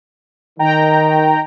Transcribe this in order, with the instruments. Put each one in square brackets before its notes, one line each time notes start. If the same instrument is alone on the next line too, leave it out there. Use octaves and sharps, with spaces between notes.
[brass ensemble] D#3 [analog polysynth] G5 A#5